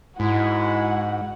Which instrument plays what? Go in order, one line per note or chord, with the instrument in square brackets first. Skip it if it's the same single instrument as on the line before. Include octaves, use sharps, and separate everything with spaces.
[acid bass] G#2 [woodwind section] G#3 E4 [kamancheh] F#4 F#5